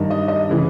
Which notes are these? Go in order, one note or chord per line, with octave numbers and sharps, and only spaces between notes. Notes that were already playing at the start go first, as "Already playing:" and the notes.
Already playing: G2 D#3
D#5
D#5
C#3 E3